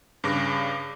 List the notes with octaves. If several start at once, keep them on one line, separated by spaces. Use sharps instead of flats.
G2 C#3 D6 A#6